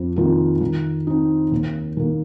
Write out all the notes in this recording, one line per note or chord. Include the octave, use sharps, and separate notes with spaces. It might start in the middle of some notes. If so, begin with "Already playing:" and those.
Already playing: F2
C3 D#3 A#3 F4
D#3
C4 D#4
D#2
D#3 A#3